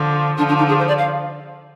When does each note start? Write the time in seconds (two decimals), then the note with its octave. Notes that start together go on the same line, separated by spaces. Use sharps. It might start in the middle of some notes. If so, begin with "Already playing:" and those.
Already playing: D3 F3
0.38 D3 F3 D4
0.48 D4
0.58 D#4
0.68 G#4
0.79 C5
0.88 D5
0.98 F5